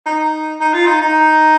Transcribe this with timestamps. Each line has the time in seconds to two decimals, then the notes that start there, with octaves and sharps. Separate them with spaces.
0.06 D#4
0.60 D#4
0.74 F4
0.87 D#4
1.01 D#4